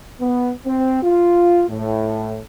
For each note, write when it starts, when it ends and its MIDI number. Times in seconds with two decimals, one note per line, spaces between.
0.20 0.52 59
0.66 1.02 60
1.03 1.64 65
1.69 2.41 45